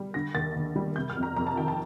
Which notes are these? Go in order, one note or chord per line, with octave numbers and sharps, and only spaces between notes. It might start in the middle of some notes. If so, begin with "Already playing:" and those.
Already playing: G3
D3 A#6
D#2 A6
D#2
G3
C3 G6
F6
F2
A#5
F2 A#5
A5
D#3 G5
A5